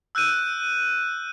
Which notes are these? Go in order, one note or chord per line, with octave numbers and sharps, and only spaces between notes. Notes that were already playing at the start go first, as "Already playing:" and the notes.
E6 F#6 G6 D#7